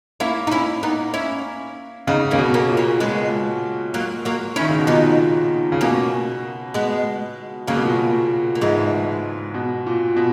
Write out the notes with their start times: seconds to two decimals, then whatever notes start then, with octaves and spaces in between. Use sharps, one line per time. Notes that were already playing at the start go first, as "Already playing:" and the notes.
0.20 A#3 C#4 E4
0.47 D#4
0.51 C#4 E4
0.83 B3 D#4
1.14 C#4 E4
2.07 C#3 B3 D#4
2.31 C#3 A#3 C#4
2.38 B2
2.54 A#3 C#4
2.69 A#2
2.77 A#3 C#4
3.00 A#2 G#3 B3
3.94 F#3 A#3
4.25 F#3 A#3
4.56 D#3 C#4 E4
4.69 C#3
4.79 B2
4.87 A#2 B3 D#4
5.72 C#3
5.81 B2 A#3 C#4
6.74 G#3 B3
7.67 C#3 F#3 A#3
7.76 B2
7.85 A#2
7.93 B2
8.55 A#3
8.61 G#2 E3 G#3
9.54 B2
9.86 A#2
10.16 B2